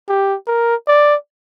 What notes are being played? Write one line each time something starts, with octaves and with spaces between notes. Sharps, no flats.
G4
A#4
D5